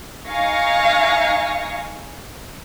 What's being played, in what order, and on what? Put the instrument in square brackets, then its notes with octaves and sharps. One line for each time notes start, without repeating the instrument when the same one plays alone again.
[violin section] D#4 F5 G#5 C#6 A#6